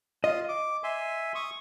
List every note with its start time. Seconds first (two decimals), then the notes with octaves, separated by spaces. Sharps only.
0.24 F4 D#5 D#6
0.49 D6
0.84 E5 G#5 C6
1.35 C#6 D#6